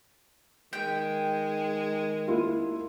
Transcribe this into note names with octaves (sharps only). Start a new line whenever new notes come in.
D#3 G#3 G5
A#3 E4 F4